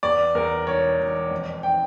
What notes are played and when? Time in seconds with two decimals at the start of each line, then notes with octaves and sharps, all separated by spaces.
0.03 E2 D5
0.35 E2 A#4
0.67 E1 C#5
0.99 E1
1.31 F2
1.63 G5